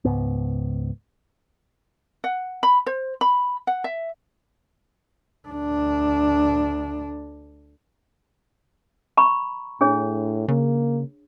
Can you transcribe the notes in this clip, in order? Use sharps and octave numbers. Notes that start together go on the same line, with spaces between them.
C#2 G#2 B3
F#5
B5
C5
B5
F#5
E5
D2 D4
A#5 B5 C#6
A2 D4 G#4 C#5
C#3 A#3